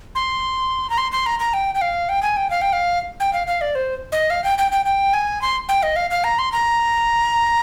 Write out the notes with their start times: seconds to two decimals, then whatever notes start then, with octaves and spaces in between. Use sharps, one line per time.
0.15 C6
0.90 A#5
0.98 C6
1.12 C6
1.26 A#5
1.39 A#5
1.54 G5
1.75 G5
1.81 F5
2.09 G5
2.22 G#5
2.37 G5
2.50 F5
2.62 G5
2.73 F5
3.20 G5
3.33 F5
3.47 F5
3.61 D5
3.75 C5
4.12 D#5
4.30 F5
4.44 G5
4.58 G5
4.72 G5
4.86 G5
5.14 G#5
5.42 C6
5.69 G5
5.83 D#5
5.96 F5
6.11 F5
6.24 A#5
6.39 C6
6.52 A#5